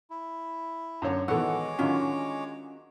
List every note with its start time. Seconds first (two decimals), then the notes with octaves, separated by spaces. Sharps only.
0.10 E4
1.02 F#2 D3 C#5
1.28 B2 D#3 E3 G#3 A4 C#5 F#5 D6
1.79 D3 D#3 F#3 C#4 F4 F#4